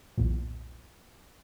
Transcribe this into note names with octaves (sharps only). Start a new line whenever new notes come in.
B1 E2 A#2